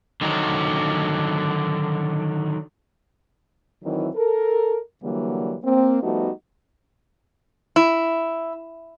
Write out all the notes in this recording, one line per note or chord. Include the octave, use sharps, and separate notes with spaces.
D3 D#3 F#3
D#3 E3 F#3 C4 E4
A4 A#4
D3 E3 F#3 G3 A#3
A#3 C4
F3 G3 A3 B3 D#4 F#4
E4